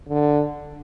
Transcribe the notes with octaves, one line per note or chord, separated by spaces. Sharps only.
D3